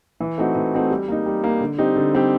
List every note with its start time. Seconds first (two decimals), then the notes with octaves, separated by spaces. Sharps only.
0.20 E3
0.38 A3 C4 D#4 F#4
0.55 E3
0.74 A3 C4 D#4 F#4
0.90 G3
1.08 A#3 D#4
1.26 G3
1.44 A#3 D#4
1.60 D3
1.78 G3 C4 D#4 G4
1.96 D3
2.14 G3 C4 D#4 G4